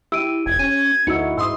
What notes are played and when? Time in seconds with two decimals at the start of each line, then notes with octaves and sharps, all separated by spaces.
0.12 E4 G4 E6 D7 D#7
0.46 F1 G#6
0.59 C#4 D#7
1.07 D2 D#4 E4 F#4 E6 C#7
1.38 G#2 C6 D#6 E6